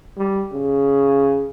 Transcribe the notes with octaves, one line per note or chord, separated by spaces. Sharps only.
G3
C#3